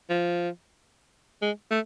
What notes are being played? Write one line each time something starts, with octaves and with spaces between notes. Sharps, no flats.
F3
G#3
A3